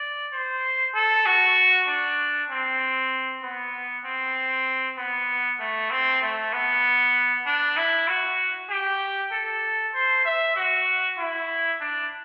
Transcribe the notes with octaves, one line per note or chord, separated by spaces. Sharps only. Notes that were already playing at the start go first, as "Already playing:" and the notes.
Already playing: D5
C5
A4
F#4
D4
C4
B3
C4
B3
A3
C4
A3
B3
D4
E4
F#4
G4
A4
C5
E5
F#4
E4
D4